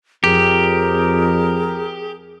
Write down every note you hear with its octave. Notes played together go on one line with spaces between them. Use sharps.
F2 G4 G#4 A#4